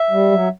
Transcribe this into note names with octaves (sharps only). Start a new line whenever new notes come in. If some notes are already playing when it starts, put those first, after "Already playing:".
Already playing: E5
G3
F#3